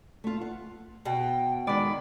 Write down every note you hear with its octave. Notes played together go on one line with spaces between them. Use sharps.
A3 F4
F#5
B2 G5
D#3 G#3 D5 B5